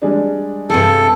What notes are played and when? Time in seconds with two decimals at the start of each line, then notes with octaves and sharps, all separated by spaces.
0.02 G3 G#3 D4
0.70 G2 C3 G3 G#4 A4